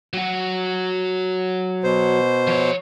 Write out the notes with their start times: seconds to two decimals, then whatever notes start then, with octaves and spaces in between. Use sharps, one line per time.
0.13 F#3 F#4
1.84 B2 C5
2.47 F3 C#5